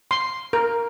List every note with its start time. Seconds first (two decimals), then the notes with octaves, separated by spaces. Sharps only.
0.11 C6
0.53 A#4